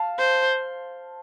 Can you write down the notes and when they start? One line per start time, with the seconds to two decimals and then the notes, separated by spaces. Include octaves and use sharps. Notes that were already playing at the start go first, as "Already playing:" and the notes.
Already playing: F5 A5
0.18 C5